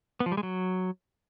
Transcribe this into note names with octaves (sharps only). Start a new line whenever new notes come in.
B3
F3
G3
G#3
F#3